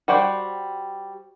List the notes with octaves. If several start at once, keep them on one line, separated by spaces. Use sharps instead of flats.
G3 F#4 C5 G5